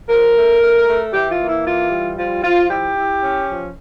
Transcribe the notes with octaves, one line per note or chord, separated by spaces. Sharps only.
F3 A#4
A3
A3
A3
E3 G4
F4
A#3
E4
E3 F4
G3
F3 F4
F3 F4
E4 G4
E4
C#4
F3